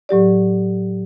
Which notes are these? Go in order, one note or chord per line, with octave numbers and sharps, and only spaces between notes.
A2 F#3 G4 D5